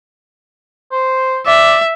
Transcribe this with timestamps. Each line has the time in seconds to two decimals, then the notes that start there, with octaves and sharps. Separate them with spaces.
0.92 C5
1.46 D5 E5